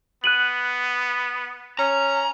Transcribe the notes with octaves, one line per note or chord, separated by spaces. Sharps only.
B3 F#6 D#7 F#7
C#4 A#5